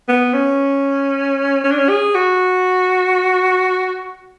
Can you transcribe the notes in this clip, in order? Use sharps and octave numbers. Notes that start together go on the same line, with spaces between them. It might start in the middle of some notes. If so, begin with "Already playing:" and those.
B3
C#4
C#4
D4
C#4
G#4
F#4